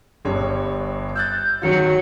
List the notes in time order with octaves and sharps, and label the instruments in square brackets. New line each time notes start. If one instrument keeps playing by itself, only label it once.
[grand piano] G1 G2 C#5
[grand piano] E6 F#6 A6 [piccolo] G6
[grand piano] D1 D#3 [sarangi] F#3 [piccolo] C#7